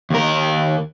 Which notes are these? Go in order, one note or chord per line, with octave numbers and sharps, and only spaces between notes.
D#2 A#4